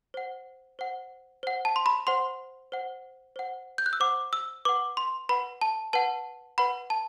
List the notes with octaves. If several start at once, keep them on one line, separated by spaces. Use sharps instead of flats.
C5 F#5
C5 F#5
C5 F#5
A5
C6
B5
C5 F#5 C6
C5 F#5
C5 F#5
G6
F#6
E6
C5 F#5 D6
E6
B4 F#5 D6
C6
B4 F#5 B5
A5
B4 F#5 A5
B4 F#5 B5
A5